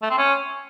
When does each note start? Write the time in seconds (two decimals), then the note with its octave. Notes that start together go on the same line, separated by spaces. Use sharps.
0.02 A3
0.10 C4
0.18 C#4